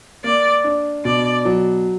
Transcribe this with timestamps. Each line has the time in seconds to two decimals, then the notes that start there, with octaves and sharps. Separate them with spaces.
0.24 A#3 D5
0.64 D4
1.05 B2 D5
1.45 F#3